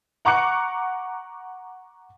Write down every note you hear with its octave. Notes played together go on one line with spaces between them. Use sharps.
F#5 A#5 C#6 D6 F#6 C#7